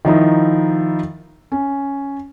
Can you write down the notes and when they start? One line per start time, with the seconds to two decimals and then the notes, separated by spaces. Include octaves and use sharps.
0.05 D#3 F3 D#4 E4
1.52 C#4